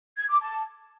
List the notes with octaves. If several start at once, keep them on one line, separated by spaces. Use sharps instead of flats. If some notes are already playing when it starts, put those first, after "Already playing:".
G#6
D6
A5